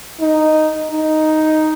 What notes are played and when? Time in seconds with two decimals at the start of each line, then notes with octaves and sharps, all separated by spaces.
0.20 D#4
0.92 D#4